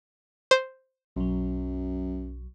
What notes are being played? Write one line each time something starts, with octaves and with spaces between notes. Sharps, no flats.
C5
B1 F#2 F#3